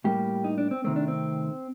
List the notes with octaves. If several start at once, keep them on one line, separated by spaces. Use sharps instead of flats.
A2 G3 A#3 G4
D#4
D4
C4
C3 D#3 A3 C4
D4
C4